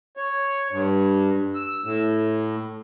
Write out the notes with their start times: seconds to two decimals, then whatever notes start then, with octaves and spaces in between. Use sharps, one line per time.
0.17 C#5
0.71 G2
1.55 E6
1.84 A2